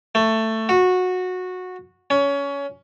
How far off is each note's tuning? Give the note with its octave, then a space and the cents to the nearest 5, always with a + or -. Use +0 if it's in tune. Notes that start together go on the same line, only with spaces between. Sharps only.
A3 +15
F#4 -15
C#4 +20